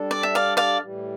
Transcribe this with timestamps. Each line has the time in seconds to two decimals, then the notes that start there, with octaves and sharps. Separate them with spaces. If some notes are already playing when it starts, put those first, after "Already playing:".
Already playing: G3 D4 A4
0.11 D5
0.23 E5
0.35 D5 F5
0.57 D5 F5
0.81 A2 E3 G3